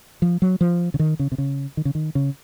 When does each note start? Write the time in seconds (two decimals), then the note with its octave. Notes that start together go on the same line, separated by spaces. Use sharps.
0.22 F3
0.42 F#3
0.61 F3
0.94 C#3
0.99 D#3
1.19 C#3
1.32 C3
1.38 C#3
1.77 D#3
1.85 C#3
1.95 D#3
2.15 C#3